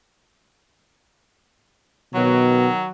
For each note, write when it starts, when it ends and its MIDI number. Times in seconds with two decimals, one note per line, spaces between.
2.15 2.68 47
2.15 2.90 51
2.15 2.90 54